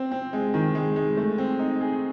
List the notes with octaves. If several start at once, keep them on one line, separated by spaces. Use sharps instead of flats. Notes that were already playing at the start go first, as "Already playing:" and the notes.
Already playing: C4
C4
G#3
D#3
G#3
G#3
A3
C4
D#4
G#4